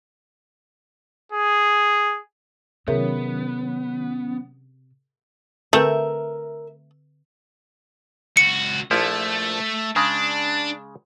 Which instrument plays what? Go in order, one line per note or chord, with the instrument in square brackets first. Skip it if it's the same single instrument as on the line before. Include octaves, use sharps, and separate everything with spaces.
[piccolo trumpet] G#4
[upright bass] C3 [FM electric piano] D#3 F#3 C#4 [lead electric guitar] B3 [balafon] G#4 A#4 E5
[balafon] D3 C4 B4 [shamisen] A3 [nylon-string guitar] A#4 E5
[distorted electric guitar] C#2 F#4 [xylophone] C#7
[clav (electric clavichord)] A#1 F3 E4 [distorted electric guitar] A3
[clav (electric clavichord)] C#3 G#3 [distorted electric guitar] D4